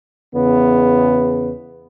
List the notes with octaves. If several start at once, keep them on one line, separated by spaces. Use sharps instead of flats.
E2 C#3 B3